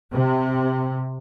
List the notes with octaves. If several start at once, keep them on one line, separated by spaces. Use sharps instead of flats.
C3